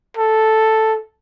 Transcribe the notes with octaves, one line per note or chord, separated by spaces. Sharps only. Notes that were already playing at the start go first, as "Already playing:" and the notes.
A4